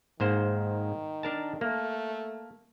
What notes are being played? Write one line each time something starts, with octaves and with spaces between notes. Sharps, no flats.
G#2 D#3 A#3 C5
D4 A#4 A5
A3 A#3